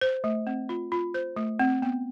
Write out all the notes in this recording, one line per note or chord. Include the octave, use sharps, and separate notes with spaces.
C5
A3
C4
F4
F4
C5
A3
C4
B3